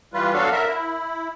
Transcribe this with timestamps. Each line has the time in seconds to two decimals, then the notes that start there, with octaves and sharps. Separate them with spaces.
0.14 E3 G3 F4 B4
0.33 F#3 B3 D4 F#4 A4 F5
0.52 A#4 E5
0.68 E4